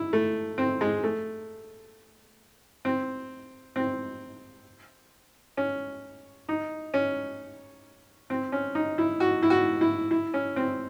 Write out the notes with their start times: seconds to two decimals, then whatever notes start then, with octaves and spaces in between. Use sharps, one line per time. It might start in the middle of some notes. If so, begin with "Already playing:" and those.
Already playing: E4
0.13 A3
0.58 C4
0.81 G#3
1.04 A3
2.85 C4
3.76 C4
5.57 C#4
6.49 D#4
6.94 C#4
8.30 C4
8.52 C#4
8.75 D#4
8.98 E4
9.20 F#4
9.43 E4
9.50 F#4
9.81 E4
10.11 E4
10.34 C#4
10.56 C4